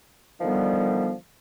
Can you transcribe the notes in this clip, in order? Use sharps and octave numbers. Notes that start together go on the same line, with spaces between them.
D3 D#3 F3 G3 B3